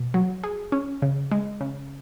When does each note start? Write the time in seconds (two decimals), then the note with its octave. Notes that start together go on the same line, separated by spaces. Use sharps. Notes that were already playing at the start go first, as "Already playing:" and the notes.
Already playing: B2
0.14 F#3
0.44 G#4
0.72 C#4
1.02 C#3
1.32 G#3
1.61 C#3